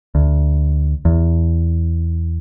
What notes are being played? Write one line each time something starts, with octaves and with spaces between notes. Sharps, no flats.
D2
E2